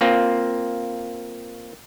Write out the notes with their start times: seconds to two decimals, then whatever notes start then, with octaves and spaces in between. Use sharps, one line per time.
0.01 A#3 C4 F4